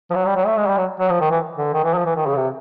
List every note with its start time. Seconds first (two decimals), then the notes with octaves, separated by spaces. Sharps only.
0.11 F3
0.15 F#3
0.26 G3
0.36 F#3
0.46 A3
0.57 G#3
0.67 G3
0.78 F#3
1.00 F#3
1.10 F3
1.21 D#3
1.31 E3
1.58 D3
1.74 D#3
1.84 E3
1.95 F3
2.06 E3
2.16 D#3
2.27 C#3
2.37 C3